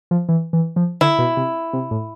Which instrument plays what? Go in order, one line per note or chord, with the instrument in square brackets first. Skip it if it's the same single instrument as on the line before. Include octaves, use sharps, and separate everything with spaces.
[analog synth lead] F3
E3
E3
F3
[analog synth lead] D3 [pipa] E4
[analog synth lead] B2
C3
C3
A2